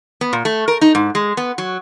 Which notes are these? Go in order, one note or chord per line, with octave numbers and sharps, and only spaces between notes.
B3
A#2
A3
A#4
D#4
G#2
G#3
B3
F#3